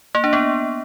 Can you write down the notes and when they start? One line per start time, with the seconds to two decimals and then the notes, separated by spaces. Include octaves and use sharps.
0.15 A#3
0.24 D4
0.33 B3